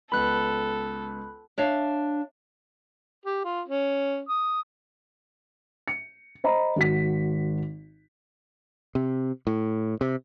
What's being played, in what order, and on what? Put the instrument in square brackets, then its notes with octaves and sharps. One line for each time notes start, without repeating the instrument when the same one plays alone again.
[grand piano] C#2 B3 B4 [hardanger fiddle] A4 [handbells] B5 F#6
[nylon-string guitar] D4 C#5 E5 F5
[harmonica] G4
F4
C#4
D#6
[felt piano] C#7
C5 D#5 A#5 B5
G#1 F#4 B6
[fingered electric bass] C3
A2
C3